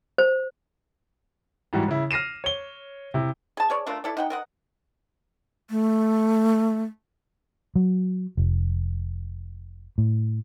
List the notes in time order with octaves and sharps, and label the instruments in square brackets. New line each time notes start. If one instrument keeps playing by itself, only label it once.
[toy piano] C5
[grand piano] G#2 E3 G3 F#4
C#3 E4
F6 A#6 C7 D#7 E7
C#5 G7
C3 E4
[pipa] G#4 A5
G#4 C#5 D5
A3 D4 F4 A#4
E4 A4 D5
D#4 F#5 G5
A#4 D#5 F#5
[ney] A3
[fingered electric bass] F#3
F1
A2